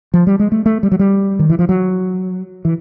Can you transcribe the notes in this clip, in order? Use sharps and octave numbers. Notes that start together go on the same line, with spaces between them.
F3
G3
G#3
A3
A3
G3
F#3
G3
D#3
E3
F3
F#3
E3